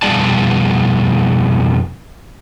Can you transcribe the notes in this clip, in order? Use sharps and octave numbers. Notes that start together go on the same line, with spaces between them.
F2 B2 G3 G#4 D5 A5